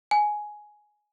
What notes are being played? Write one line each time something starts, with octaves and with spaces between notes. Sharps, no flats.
G#5